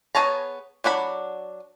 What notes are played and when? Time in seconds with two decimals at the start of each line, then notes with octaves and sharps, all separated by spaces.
0.15 B3 G#4 C#5 A5 A#5
0.84 F#3 D4 F#5 B5